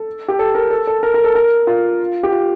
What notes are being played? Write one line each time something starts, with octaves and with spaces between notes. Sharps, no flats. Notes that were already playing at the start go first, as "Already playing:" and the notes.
Already playing: A4
G4
A4
A#4
A4
A4
A#4
A#4
A4
A#4
F4
G4
F4